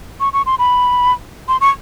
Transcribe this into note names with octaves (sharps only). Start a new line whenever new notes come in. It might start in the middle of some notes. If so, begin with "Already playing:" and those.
C#6
C#6
C6
B5
C6
C#6